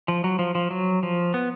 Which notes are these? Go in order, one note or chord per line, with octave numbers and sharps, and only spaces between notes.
F3
F#3
F3
F3
F#3
F3
B3